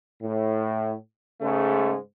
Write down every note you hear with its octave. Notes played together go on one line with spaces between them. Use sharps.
A2
G#2 C#3 G#3 A3